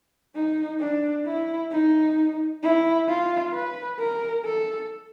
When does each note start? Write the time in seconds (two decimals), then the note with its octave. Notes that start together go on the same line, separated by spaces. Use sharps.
0.35 D#4
0.80 D4
1.26 E4
1.72 D#4
2.63 E4
3.08 F4
3.54 B4
3.99 A#4
4.45 A4